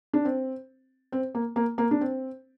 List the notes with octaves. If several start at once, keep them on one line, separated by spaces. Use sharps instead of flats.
D4
C4
C4
A#3
A#3
A#3
D4
C4